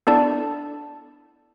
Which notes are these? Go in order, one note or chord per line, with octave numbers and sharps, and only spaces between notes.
B3 D4 E4 A4 D5 A5